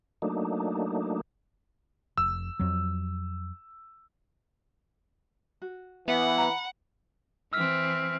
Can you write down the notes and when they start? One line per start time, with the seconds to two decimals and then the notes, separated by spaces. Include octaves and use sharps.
0.22 F#3 A3 A#3 D4 D#4
2.18 F1 E6
2.60 F2 F#3
5.62 F#4
6.08 E3 B3 E5 F#5
6.38 A#5 B5
7.53 E3 C4 E6 F6 B6